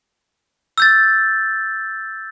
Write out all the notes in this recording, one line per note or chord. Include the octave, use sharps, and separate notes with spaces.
E6 G6 A6